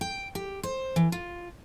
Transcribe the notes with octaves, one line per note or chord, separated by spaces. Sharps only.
G5
G4
C5
E3
F4